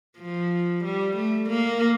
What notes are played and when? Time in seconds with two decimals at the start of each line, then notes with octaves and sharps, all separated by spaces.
0.18 F3
0.85 G3
1.17 A3
1.49 A#3